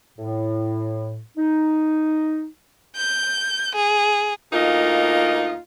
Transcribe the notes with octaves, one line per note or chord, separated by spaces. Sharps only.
A2
D#4
G6
G#4
D2 A#3 D#4 F4 D#5